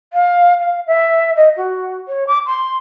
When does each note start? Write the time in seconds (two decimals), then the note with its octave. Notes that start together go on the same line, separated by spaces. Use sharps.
0.13 F5
0.59 F5
0.87 E5
1.36 D#5
1.57 F#4
2.08 C#5
2.27 D6
2.46 C6